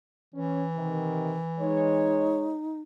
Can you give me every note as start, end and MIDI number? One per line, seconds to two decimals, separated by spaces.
0.35 2.43 52
0.35 0.64 61
0.76 1.38 48
0.76 1.38 51
1.60 2.56 56
1.60 2.80 63
1.60 2.56 73